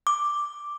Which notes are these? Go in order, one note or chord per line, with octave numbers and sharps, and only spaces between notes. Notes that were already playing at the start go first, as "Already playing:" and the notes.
D6